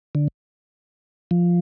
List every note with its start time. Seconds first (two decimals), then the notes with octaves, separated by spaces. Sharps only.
0.15 D3
1.31 F3